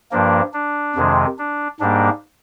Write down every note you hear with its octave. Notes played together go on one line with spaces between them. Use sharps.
G2 F3 A#3 D4
D4
F2 C3 D#3 G#3
D4
G#2 G3 A#3 D4